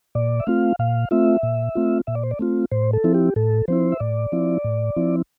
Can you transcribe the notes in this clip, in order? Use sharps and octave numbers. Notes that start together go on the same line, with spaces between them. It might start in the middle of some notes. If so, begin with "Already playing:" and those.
A#2 D5
E5
A3 C4 F4 F5
A#2 F5
A3 C4 F4 E5
A#2
A3 C4 F4
A#2 E5
D5
C5
D5
A3 C4 F4
A2 C5
A4
F3 C4 E4
G4
A2 A4
F3 C4 E4 C5
E5
A2 D5
F3 C4 E4
A2
F3 C4 E4